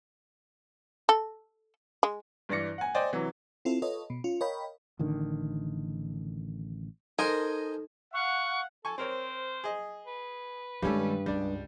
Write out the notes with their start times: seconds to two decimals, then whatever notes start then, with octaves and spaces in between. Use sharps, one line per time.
1.09 A4
2.03 G#3
2.49 G2 E3 D5 A#6 C#7
2.78 F#5 G#5
2.94 C5 D5 D#5 G5 G#5
3.13 C3 E3 F#3
3.65 C4 E4 F4 A4
3.82 F4 A4 B4 C#5 D#5
4.10 B2
4.24 C#4 F4
4.41 A#4 C#5 D#5 F5 G5 B5
4.99 A1 D3 D#3
7.19 D#4 A4 A#4 C5 D#5 G#5
8.14 F5 F#5 C#6
8.85 A4 G#5 C#6
8.98 C4 A#4 C5 C#5
9.64 G#4 D#5
10.07 B4
10.82 G2 D#3 G3 G#3 C#4 A4
11.26 C#2 G3 D4